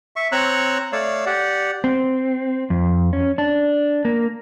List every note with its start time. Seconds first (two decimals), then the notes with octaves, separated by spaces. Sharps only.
0.16 E5 C#6
0.32 C4 C#5 A#5 C#6 E6 F#6
0.92 A3 C#5 D5 F5 E6
1.26 G4 D5 F#5
1.84 C4
2.70 F2
3.13 C#4
3.38 D4
4.05 A#3